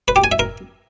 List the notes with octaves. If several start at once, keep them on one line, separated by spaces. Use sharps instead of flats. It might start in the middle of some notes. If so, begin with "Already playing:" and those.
B4
G4
G#5
E5
A#4